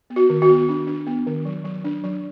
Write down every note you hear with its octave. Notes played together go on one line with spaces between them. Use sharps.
B3
F#4
D#3
F#4
B3
D4
D4
B3
D#3
F#3
F#3
D4
F#3